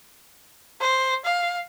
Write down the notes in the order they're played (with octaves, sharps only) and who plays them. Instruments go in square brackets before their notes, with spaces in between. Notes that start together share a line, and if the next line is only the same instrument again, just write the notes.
[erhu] C5
F5